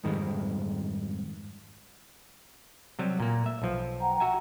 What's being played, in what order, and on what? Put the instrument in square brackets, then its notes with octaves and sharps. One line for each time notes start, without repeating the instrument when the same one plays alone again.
[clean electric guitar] F2 G#2 D#3 G3 G#3
[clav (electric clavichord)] C3 F#3 G3
A#2 A#3
E5
B1 F3
[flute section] F#5 G5 A#5
[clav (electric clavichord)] F#4 E5 G#5